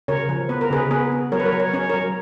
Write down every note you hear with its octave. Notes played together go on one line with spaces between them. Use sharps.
C#3 A#4 C#5
F3
B3 B4
A#4
C#3 G#4 B4
B3 G#4 B4
B3
F#3 A#4 C#5
B4
A#4 C#5
F#3
C#5
C#4 C#5
F#3 A#4 C#5